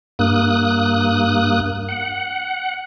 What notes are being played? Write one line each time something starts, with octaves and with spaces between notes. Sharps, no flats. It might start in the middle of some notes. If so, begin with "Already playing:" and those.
G2 A#3 D#6 F#6
F#5